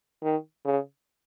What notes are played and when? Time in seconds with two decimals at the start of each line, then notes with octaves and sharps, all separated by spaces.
0.23 D#3
0.65 C#3